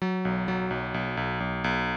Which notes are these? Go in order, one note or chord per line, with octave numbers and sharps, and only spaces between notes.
F#3
B1
F#3
B1
B1
B1
B1
B1